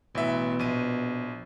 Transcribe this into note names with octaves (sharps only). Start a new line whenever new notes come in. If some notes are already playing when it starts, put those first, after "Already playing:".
A1 B2 E3 E5
A#1 D#7